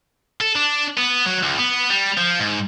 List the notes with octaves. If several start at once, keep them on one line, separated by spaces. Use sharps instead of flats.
A4
D4
B3
F#3
C#2
B3
G3
F3
G#2